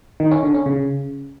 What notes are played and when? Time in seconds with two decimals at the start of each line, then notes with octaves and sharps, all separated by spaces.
0.20 D#3
0.31 C#4
0.43 D3
0.55 C#4
0.66 C#3